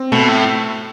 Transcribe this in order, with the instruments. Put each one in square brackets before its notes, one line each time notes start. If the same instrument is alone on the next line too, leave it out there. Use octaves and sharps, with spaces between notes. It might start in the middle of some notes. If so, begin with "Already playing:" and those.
Already playing: [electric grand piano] C4
[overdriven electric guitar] B2 [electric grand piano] A3
[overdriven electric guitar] A2